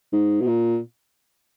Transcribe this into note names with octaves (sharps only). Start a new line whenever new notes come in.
G#2
B2
A#2